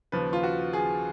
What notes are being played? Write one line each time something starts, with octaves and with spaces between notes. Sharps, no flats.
D#2 C#3 F3 B4
F4
F#4
G#4